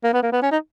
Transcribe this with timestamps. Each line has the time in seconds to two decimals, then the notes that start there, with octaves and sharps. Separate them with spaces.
0.04 A#3
0.13 B3
0.23 A#3
0.32 B3
0.42 C#4
0.51 D#4